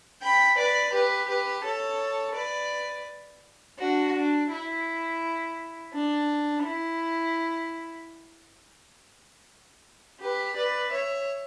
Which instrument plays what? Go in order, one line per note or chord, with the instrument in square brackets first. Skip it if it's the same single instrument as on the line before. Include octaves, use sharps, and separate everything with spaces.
[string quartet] G5 B5
B4 D5
G4 B4
G4 B4
A4 C#5
B4 D5
D4 F#4
D4
E4
D4
E4
G4 B4
B4 D5
C#5 E5